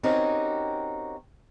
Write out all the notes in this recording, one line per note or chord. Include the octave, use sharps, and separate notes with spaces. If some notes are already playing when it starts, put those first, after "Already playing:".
C4 C#4 D#4 F#4 G4 A#4